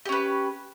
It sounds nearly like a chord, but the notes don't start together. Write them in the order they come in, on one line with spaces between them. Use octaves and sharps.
G4 C#4 B4